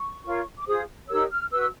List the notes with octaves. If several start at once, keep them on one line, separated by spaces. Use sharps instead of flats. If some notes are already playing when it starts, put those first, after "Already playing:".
Already playing: C#6
F4 A#4 C#5
D6
F4 G#4 C5 D#6
D#4 G4 A#4 C#5 E6
F6
F#4 B4 E6